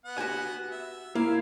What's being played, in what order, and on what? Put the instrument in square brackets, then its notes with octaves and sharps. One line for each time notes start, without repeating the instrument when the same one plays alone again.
[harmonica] B3 F#5
[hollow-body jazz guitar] F#4 G4 G#5
[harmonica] E5
[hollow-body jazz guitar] A#3 [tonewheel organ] E4 [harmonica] F5